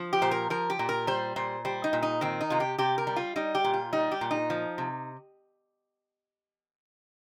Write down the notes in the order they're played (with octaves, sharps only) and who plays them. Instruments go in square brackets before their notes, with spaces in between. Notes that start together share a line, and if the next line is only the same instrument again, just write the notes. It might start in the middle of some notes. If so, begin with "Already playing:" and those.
Already playing: [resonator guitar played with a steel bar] F3
G4
A#2 C5
A#4
F3 A#4
G4
A#2
A#4
G3 C5
A#2 C5
G3 C5
D#4
A#2
D#4
D#3 C4
D#4
C3 F4
G4
C3 G4
A#4
G3
F4
G3 D#4
G4
A#2
F4
G3 D#4
G4
A#2
D#4
F3
C3